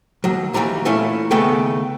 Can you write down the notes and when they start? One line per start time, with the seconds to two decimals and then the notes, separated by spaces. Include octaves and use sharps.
0.24 D#2 F#3
0.54 D#2 E3 G3 A#5
0.85 A#2 E3 A3 C#4 E4
1.31 D#2 C#3 A3 B3 A4 G5